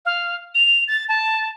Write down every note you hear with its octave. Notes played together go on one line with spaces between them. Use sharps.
F5
F7
A6
A5